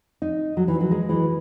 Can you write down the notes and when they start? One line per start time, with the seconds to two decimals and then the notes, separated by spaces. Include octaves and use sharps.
0.22 D#4
0.57 F#3
0.68 E3
0.81 F#3
0.91 G#3
1.09 E3